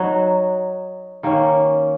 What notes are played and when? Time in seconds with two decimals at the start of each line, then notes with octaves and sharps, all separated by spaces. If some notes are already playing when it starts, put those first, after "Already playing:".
Already playing: F#3 D#4 F#4
1.23 D#3 A#3 C#4